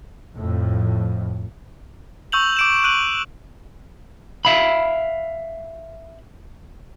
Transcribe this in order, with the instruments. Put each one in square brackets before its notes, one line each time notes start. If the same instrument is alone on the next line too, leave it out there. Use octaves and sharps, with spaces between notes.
[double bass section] F2 A2
[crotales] C#6 E6 G6 F7 F#7
D6 D7 E7
F#6 D#7 F#7
[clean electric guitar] E5 F5 B5